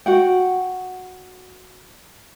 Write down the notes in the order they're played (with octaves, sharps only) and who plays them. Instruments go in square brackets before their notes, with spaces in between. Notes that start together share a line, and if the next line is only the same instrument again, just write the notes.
[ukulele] F#4 F#5 G5